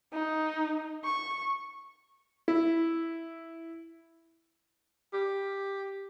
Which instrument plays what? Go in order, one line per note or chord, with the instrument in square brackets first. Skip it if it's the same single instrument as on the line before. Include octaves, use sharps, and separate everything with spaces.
[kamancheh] D#4
C#6
[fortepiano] E4
[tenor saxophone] G4